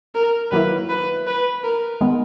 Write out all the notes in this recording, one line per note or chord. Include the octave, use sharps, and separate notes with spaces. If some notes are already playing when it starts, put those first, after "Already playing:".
A#4
D#3 F#3 A#3 E4 B4
B4
B4
A#4
D#3 G#3 B3